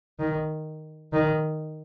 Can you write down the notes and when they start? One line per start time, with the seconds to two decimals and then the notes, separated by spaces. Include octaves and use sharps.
0.19 D#3
1.13 D#3